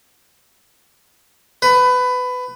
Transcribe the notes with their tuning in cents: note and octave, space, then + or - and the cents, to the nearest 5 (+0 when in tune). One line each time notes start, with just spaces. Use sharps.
B4 +20